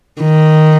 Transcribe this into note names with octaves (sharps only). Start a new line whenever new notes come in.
D#3